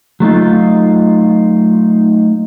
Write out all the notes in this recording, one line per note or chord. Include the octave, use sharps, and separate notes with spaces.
F#3 A3 D#4 F4